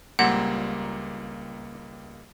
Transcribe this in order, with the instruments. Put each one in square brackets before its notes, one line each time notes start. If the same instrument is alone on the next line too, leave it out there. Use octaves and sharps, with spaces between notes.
[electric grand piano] C#2 G3 A#3 [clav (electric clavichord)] A#2 C4 E4 [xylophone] F#5